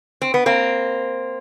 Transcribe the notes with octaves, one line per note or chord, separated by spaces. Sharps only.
C4
B3
A#3 C4